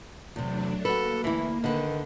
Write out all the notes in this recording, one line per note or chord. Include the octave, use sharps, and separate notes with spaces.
E2 C3 F#3 A3 D4
A#3 F#4 A4 B4
D2 E3 E4
D3 D#3 B4